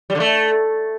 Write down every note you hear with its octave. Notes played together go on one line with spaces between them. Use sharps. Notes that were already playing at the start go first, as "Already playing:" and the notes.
G3
D3
A3